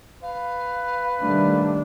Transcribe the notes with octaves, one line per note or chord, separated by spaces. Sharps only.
B4 F5
D#3 G3 A3 D4